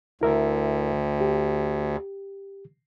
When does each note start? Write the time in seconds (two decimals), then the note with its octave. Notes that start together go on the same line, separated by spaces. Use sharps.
0.21 D2 E4 A#4 E5
1.21 G4